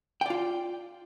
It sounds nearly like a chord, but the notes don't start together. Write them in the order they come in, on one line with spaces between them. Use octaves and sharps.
G5 D5 F4